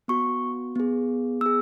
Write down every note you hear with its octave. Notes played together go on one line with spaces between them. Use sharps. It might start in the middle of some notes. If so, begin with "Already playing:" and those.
B3 F#4 C#6
B3 G#4
B3 G#4 E6